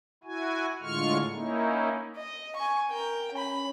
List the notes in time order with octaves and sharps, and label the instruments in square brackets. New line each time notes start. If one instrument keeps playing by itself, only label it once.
[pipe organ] E4 F#4 G#5
A2 D3 G#3 F4 C#6 F6
A#3 C#4 D#4 E4
[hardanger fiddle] D#5
G#5 C#6
A#4 G5
C#4 B5